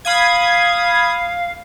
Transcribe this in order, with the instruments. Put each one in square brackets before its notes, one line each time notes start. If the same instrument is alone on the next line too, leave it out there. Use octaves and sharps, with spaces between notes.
[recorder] F5 [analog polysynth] B5 D#6 G#6